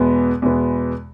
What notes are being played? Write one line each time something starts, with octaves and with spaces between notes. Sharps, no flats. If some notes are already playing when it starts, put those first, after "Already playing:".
Already playing: E2 B2 G#3 B3
E2 B2 G#3 B3